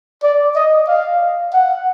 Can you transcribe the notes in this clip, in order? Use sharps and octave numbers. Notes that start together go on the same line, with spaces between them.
D5
D#5
F5
F#5